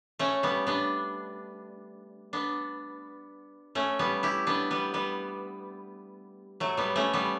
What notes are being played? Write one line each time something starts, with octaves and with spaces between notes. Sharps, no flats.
A3 C#4
G3 B3
B3 D4
B3 D4
A3 C#4
G3 B3
E4 G4
B3 D4
G3 B3
G3 B3
F#3 A3
G3 B3
A3 C#4
G3 B3